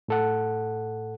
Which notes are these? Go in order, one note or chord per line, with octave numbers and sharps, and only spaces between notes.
A2 A4 F#5